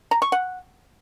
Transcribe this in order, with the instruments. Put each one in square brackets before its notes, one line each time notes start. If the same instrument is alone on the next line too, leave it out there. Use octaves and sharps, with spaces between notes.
[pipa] A#5
C#6
F#5